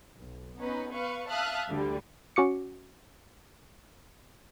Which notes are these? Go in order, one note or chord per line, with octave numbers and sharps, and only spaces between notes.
B1
B3 C#4 D#4 B4
B4 F5 C#6
E5 F5 A5 D#6 F6 F#6
D2 D3 G3
C#4 F#4 D6 C#7